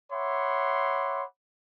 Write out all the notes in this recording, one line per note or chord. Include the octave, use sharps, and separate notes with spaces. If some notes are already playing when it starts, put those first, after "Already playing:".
C#5 E5 F#5 B5 C6 D6